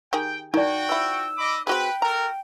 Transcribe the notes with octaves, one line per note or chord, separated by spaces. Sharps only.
D#3 G4 G#4 G5
D#3 D#4 F#4 D5 G5
F3 E4 E6
D#5 B5 D6
C4 F#4 G#4 B4 G5
F#4 A4 A#4 A#5